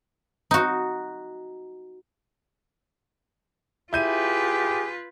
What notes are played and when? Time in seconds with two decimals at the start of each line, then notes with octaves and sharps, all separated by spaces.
0.51 D#4 F#4
3.93 E4 F4 G4 G#4 B4 G6 D#7